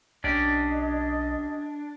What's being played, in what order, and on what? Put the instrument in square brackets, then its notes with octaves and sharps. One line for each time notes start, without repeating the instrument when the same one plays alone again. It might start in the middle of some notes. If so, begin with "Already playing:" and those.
[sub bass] B1 [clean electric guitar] C#4 G4 D5 [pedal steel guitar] D4 [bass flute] D#5